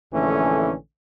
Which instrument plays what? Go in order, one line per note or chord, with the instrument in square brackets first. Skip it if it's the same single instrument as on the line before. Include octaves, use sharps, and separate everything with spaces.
[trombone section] A#1 D3 E3 A3 C#4